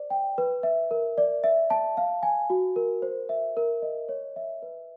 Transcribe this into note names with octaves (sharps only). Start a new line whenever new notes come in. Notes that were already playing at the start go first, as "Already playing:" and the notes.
Already playing: C5 D5
G5
B4
E5
A#4
D5
E5
A5
F5
G#5
F#4
A#4
C5
E5
A#4
D#5
C#5
E5
B4